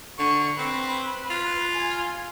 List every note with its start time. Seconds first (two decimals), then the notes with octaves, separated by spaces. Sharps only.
0.19 D3 C#6
0.58 C4 B4
1.30 F4
1.73 G#5